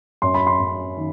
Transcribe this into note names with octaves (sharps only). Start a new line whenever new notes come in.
F#2 C6
B5
C6
F#2
D#3